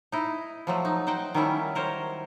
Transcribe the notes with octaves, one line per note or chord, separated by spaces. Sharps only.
D#4 E4 D#5
F3 F#3 A3
D#4
D#4 C5 F#5 G5
D#3 F#3 G3 A3 C#4 E4
A#4 C5 C#5